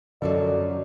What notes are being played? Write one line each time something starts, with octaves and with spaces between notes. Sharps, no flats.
F#2 D3 F3 F#3 A4 D5 D#5